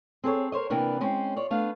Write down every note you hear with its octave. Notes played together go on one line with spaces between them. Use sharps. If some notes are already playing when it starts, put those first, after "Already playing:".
C4 G#4 A4 C#5
A#4 C5 C#5 D#5
C3 E3 A#3 B3 D4 B4
G#3 C4 C#4
F4 C#5 D5
A3 B3 D4 B4 F5